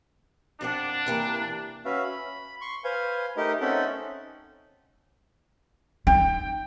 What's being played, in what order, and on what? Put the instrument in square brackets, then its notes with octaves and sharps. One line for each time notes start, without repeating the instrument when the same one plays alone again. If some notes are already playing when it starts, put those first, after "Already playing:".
[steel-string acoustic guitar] F2 G4 F#5 [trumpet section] D4
[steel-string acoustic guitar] C3 E3 A#3
[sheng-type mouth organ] C#4 F#4 B4 E5 F5
B5
C6 C#6
B4 C5 F5 G#5
A3 D#4 G4 A#4 D#5
C4 C#4 D#4 A4 E5 F#5
[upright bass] D#4 [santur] G5